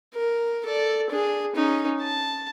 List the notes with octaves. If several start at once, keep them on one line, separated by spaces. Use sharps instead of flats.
A#4
A4 D5
D4 G#4
C#4 D#4
A5